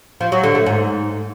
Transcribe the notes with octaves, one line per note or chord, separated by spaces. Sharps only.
F3
F#3
D3
A3
G#2